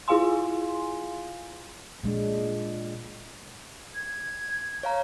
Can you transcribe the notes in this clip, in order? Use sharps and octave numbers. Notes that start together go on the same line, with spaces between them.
E4 F4 G#4 F5 G#5 C6
A#2 G#3 D4
G#6
C#5 F5 A#5